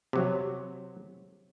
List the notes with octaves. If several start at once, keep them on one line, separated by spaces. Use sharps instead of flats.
C3 F#3